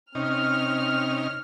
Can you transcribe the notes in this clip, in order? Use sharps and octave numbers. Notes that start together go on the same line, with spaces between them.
C3 C4 C#4 D#4 F6